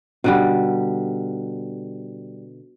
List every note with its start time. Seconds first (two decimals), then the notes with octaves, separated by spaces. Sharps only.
0.24 B2 D3 G3